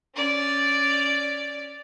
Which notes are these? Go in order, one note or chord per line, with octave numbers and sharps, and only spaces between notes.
C#4 D5